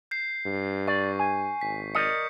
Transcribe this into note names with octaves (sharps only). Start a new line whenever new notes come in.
G6 C7
G2
D5 C#6
G#5
G#1 B6
A#4 D5 D#5 G6 B6 C#7